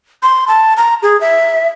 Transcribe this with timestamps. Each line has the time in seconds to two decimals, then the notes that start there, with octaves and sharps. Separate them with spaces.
0.23 C6
0.48 A5
0.77 A#5
1.03 G#4
1.21 E5